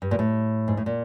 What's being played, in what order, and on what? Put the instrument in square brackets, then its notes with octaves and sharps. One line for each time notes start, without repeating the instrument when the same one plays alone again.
[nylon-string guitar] G2
A#2
A2
G#2
A2
A#2